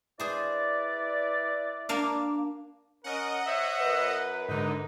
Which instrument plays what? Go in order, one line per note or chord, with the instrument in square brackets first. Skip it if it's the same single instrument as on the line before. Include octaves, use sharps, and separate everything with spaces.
[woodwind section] E4 B4 D5 [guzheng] G#4 C5
[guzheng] A#3 D4 F5
[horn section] C#4 A#4 [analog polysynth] D#5 F#5
[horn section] C5 C#5 E5
[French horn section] F#2 A#4 B4
[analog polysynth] G#2 D3 [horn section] D#4